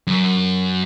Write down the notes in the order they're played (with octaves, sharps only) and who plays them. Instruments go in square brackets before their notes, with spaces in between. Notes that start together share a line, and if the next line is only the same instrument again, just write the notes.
[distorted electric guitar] F#2